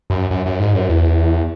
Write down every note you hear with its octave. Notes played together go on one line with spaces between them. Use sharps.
F#2
F#2
F#2
G#2
F#2
E2